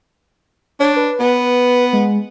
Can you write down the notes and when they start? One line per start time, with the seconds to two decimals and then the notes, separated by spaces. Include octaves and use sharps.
0.80 D4 C#5
0.96 B4
1.20 B3
1.93 G#3